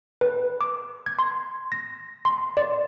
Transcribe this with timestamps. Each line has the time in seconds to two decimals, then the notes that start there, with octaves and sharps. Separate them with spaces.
0.21 B4
0.61 D6
1.06 G#6
1.19 C6
1.72 A#6
2.25 C6
2.57 D5